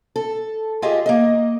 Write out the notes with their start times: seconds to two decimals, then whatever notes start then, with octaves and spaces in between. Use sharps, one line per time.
0.16 A4
0.82 F4 G4 G#4 D#5 E5
1.06 A#3 D#5